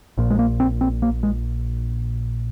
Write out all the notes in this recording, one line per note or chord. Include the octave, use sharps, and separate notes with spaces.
A#1 A#2
G#3
A#3
C4
C4
A#3
G#3